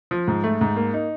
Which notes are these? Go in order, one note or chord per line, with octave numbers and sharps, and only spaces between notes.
F3
G#2
A3
G#2
A#3
D#4